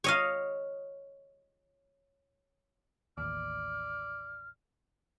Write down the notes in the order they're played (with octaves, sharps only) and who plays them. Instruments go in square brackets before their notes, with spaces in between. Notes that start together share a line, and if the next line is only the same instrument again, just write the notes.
[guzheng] C#5 D#5 F5
[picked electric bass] A1 D#2 [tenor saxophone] D5 [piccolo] F6